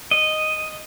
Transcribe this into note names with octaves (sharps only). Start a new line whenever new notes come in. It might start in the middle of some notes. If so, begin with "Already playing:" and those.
D#5